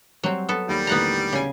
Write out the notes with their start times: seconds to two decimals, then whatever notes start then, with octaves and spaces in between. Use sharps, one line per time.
0.23 F#3 G3 C4
0.49 B3 A4
0.68 D#2 G3 B5 A#6
0.87 A1 D#2 D3 B3 F#5 A#5
1.32 C#3 G#5